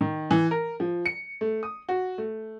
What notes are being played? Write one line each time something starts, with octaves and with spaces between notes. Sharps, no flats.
D#3
E3
A#4
F3
C#7
A3
D#6
F#4
A3